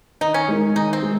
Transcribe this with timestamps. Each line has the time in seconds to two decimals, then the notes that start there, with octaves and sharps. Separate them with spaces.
0.21 D#3 D#4
0.34 C#4
0.48 G#3 D#4 A#4
0.76 D#3 D#4
0.93 C4
1.03 G#3